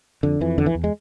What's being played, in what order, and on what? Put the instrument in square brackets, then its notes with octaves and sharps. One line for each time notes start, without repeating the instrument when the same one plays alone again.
[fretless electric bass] F2 D3
F2 E3
E2 D3
E3
E2
G#3